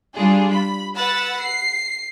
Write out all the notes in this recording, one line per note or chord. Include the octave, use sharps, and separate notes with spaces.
G3 D4 F4 G#4
B5
B4 F#5 B5 E6 A6
C7